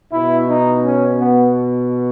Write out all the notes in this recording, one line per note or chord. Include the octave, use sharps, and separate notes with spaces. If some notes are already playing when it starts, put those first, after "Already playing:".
B2 E4
D#4
C#4
B3